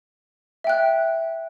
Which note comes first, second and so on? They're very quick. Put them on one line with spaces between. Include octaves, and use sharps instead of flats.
E5 G5 F#6